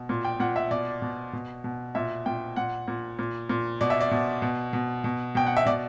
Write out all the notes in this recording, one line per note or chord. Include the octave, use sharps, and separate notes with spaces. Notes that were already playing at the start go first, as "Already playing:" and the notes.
Already playing: B2
A#2
G5
A#2 F#5
E5
B2 D5
B2
B2
B2
A#2 E5
A#2 G5
A#2 F#5
A#2
A#2
A#2
B2 D5
E5
D5
B2
B2
B2
B2
B2 G5
F#5
E5
B2 D5